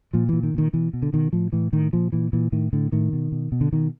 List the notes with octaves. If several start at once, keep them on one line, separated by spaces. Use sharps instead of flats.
A#2 F3
A#2 E3
D#3
A#2 D#3
B2 E3
B2
D3
B2 D#3
A2 F3
A2 E3
A2 D#3
A#2 F3
A#2 E3
A#2 E3
A2 D#3
A2 D3
A2 D#3
B2
B2
B2
D3
B2 D#3